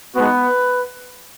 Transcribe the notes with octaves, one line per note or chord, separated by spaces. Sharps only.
G#3 B3 D#4 F#4 B4